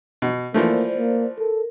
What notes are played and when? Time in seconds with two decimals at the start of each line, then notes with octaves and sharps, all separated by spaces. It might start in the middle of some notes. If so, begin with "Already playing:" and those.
0.22 B2
0.54 E3 F3 A3 A#3 C5 D5
0.97 A#3
1.38 A4 A#4